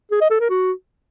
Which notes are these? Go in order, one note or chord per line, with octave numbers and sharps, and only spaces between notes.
G#4
D#5
A4
A#4
F#4